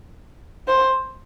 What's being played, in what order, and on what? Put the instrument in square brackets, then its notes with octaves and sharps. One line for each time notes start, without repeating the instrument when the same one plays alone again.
[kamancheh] C5